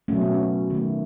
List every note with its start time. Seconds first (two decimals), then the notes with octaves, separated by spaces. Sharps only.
0.08 B2 F#3 A3 C#4
0.21 B3
0.34 C#4
0.70 D#3 A3